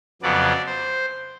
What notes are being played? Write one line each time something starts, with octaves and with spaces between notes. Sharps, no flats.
F2 C#3 F#3 B3 D5
C5